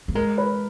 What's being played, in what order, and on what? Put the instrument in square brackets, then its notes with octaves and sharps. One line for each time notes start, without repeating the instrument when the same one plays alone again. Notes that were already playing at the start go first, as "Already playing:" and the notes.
[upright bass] A#3
[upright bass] G#3 [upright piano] A#4
[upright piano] B4